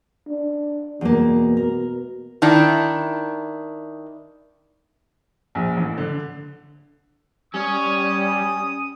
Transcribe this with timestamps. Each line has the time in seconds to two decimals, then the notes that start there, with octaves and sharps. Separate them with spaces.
0.28 D4
1.01 E2 B2 A#3
1.57 A#4
2.42 D#3 D4 E4
5.55 A#1
5.77 A1
5.98 D3
7.54 G3 C#4 C#5 D#6